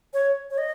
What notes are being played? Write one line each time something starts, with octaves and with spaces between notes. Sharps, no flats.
C#5
C#5
D#5